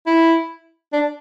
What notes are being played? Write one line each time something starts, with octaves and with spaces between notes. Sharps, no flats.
E4
D4